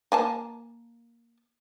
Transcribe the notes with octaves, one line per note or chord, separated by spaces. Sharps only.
A#3 G#5 A5